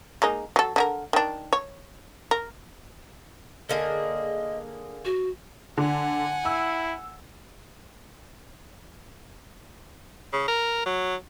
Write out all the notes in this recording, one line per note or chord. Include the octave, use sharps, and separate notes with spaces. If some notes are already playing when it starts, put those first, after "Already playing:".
G#3 A#3 D#4
F#3 A4
D3 D#4 A#4
D#3 D4
C#5
A#4
D3 A#3 G#4 D#5
F#4
D3 F#5 G#5
E4 E6
C#3
A#4
F#3